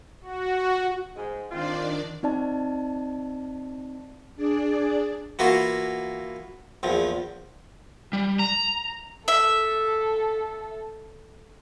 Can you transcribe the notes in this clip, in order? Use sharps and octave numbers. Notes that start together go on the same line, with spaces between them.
F#4
G#2
D#3 C4 D4 F4 D5
C4 D#4 D5 A5
D4 G#4 D5
E3 A#3 B3 F4 F#4
A#1 E2 F3
G3
A#5
A4 E5